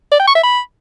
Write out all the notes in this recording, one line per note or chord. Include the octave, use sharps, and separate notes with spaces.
D5
G5
C#6
E5
B5